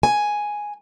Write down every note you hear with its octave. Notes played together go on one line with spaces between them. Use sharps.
G#5